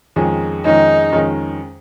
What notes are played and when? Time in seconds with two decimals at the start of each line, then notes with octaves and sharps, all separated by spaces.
0.16 F2 D#3 G#3 C#4 G#4
0.65 F2 D#3 G#3 C#4 D#4 G#4
1.13 F2 D#3 G#3 C#4 G#4